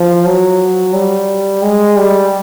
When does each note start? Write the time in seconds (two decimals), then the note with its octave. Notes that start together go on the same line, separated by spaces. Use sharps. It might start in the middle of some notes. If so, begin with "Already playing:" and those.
Already playing: F3
0.25 F#3
0.93 G3
1.63 G#3
1.97 G3